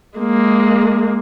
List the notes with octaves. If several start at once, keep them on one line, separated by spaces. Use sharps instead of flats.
G#3 A#3